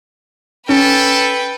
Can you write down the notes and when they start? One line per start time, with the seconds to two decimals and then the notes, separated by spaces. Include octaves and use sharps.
0.69 C#4 A4 B4 G5